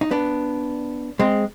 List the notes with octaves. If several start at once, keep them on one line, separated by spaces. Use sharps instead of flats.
D#4
B3 D4
G#3 C4